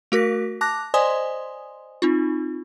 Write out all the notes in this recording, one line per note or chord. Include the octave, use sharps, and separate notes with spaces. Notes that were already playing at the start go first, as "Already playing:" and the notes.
A3 F#4 A#4 A#6 B6
A5 D6 F#6 A#6
C5 D5 D#5 G#5 C6 D#6
C4 D#4 F4